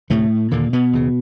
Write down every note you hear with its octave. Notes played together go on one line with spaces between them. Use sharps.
D2 A2 C3 A3
D#2 A#2 D3 A#3
B2 B3
D#2 C#3